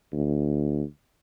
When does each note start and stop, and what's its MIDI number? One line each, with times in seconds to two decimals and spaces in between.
0.13 0.83 38